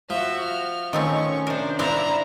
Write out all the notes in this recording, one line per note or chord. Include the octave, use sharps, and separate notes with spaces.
F3 F#4 E5
F6
D#3 A3 C4 C#4 C#6
C3 D4 A#4 C5
G3 C4 D4 E4 F5 A#5